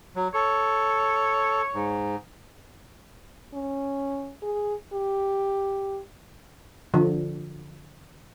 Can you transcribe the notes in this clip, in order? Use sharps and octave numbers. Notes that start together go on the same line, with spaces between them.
F#3
A4 C#5
G#2
C#4
G#4
G4
D3 F3